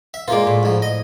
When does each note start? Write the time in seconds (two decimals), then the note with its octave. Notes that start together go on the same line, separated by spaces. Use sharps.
0.14 E5
0.28 G#3 A#3 F4 C5 D5
0.47 A2
0.63 G#2 F3
0.82 D#5